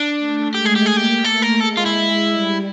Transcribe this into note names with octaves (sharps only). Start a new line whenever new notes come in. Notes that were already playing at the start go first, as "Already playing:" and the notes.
Already playing: D4
A3
G#3 G4
G#4
G4
A#3 G#4
G4
A3 A4
A#4
G#3 A4
F4
E4
G3